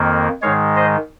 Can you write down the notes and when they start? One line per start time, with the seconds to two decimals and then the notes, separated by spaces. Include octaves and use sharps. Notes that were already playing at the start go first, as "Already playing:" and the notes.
Already playing: F2 D#3 A#3
0.42 G#2 D#3 G#3 C#5 F5
0.76 C5 D#5